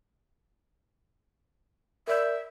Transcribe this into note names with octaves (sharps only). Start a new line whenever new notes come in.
A#4 D5 E5 G6